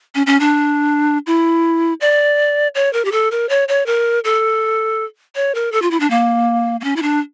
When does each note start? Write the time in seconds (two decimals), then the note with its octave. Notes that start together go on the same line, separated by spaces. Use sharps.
0.15 C#4
0.27 C#4
0.40 D4
1.27 E4
2.01 D5
2.75 C#5
2.93 A#4
3.05 G4
3.12 A4
3.31 A#4
3.49 C#5
3.68 C#5
3.86 A#4
4.24 A4
5.35 C#5
5.55 A#4
5.72 A4
5.82 F4
5.91 E4
6.00 D4
6.10 A#3
6.81 A#3
6.84 C#4
6.96 E4
7.02 D4